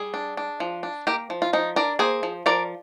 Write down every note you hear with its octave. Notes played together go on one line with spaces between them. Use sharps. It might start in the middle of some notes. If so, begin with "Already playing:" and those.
Already playing: G3 G#4
D4
D4
F3
D4
A#3 G4 A#4
F3
F4
F3 D#4
D4 A#4 D5
A#3 G#4 C5
F3
F3 A#4 D5